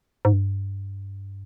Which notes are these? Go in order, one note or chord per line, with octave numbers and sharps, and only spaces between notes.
G#2
G2